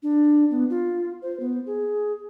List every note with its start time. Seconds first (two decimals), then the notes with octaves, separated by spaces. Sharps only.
0.03 D4
0.51 B3
0.70 F4
1.22 C5
1.40 B3
1.66 G#4